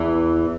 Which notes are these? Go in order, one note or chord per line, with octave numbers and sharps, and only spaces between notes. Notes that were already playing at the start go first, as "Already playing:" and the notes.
Already playing: E2 E3